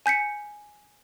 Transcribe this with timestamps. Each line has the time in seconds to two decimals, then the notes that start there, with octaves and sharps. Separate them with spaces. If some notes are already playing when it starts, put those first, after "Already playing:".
0.06 G#5 G6 B6 C#7